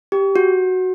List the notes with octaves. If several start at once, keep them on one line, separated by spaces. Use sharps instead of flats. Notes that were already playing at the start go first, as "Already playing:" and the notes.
G4
F#4